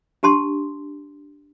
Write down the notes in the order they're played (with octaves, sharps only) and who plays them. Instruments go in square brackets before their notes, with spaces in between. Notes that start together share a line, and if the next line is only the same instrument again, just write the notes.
[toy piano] D4 G4 A5 C6